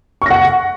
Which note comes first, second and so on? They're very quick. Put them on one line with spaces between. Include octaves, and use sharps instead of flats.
C#6 A#6 F#5